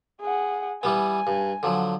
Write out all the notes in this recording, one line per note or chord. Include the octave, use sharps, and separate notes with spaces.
G#4 F#5
E3 G3 B3 G#5
G2
D3 F3 F#3